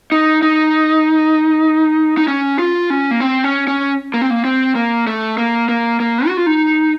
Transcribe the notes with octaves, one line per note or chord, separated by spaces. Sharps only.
D#4
D#4
D#4
C#4
F4
C#4
A#3
C4
C#4
C#4
A#3
C4
A#3
C4
A#3
A3
A#3
A#3
A#3
F#4
F4
D#4